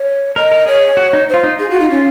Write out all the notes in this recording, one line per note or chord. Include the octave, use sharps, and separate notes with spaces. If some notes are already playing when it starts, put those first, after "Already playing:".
Already playing: C#5
A#4 D#5
A#4
G#4 C#5
F#4
D#4
F4 C5
D#4
F4 G#4
F#4
D#4
C#4